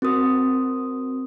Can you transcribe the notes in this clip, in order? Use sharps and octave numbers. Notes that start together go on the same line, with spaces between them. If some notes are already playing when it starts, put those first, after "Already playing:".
C4 F#4 A#4 D#6